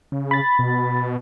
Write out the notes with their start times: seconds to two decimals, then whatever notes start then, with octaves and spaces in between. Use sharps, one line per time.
0.12 C#3
0.31 B5 A6
0.59 B2